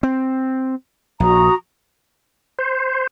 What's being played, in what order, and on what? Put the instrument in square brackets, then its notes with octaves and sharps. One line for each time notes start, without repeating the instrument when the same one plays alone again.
[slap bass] C4
[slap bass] A#1 [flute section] F#4 A#5 D#6
[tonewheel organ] C5